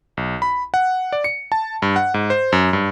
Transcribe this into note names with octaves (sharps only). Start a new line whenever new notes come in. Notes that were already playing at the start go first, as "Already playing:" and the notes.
B1
B5
F#5
D5
C#7
A5
G2
F#5
G#2
C5
F#2
G2